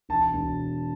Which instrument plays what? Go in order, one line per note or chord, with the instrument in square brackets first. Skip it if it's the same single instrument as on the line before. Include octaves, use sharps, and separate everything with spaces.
[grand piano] E1 A5
E1